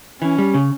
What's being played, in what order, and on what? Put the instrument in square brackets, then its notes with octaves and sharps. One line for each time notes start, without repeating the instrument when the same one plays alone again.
[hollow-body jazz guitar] E3 [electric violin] C#4
[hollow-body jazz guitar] G3
C#3